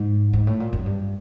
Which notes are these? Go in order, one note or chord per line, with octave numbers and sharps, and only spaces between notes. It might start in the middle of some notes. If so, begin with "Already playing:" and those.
Already playing: G#2
G#2
A2
A#2
F#2
G2